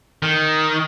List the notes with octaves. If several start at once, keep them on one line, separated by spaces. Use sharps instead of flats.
D#3